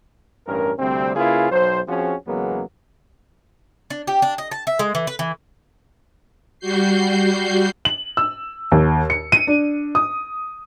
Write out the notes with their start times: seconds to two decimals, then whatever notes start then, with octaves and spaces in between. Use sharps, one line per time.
0.47 A1 G2 C#4 A#4
0.79 D2 C3 G3 C4
1.15 C#3 A#3 E4 F4 G#4 B4
1.51 B1 C5
1.88 F3 C4 C#4 F#4 G#4
2.26 E2 C#3 F#3 G#3 A#3 B3
3.90 D4
4.07 G4
4.22 D4
4.38 D#5
4.51 A5
4.67 E5
4.79 G#3
4.95 E3
5.07 B4
5.19 E3
6.59 G3 F#4 G6 C7
7.85 F#7
8.17 E6
8.72 D#2
9.10 C#7
9.32 D#7
9.47 D4
9.95 D#6